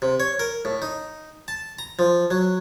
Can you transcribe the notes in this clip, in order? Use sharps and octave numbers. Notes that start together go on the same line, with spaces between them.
C3
C#5
A#4
A2
D#4
A5
A#5
F3
F#3